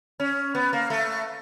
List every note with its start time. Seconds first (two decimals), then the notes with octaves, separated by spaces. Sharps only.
0.20 C#4
0.55 B3
0.73 A#3
0.90 A3